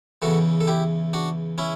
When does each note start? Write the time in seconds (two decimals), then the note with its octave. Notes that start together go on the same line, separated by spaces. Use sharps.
0.22 E2 C#3 E3 F#4 A4
0.61 A4
0.67 E4 G4
1.13 D4 F#4
1.58 C#4 E4